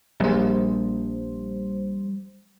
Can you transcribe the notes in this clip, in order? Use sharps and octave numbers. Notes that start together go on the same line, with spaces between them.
A#1 G3 C5